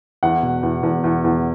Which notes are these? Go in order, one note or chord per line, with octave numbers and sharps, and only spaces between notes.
E2 F#5
B2
E2
E2
E2
E2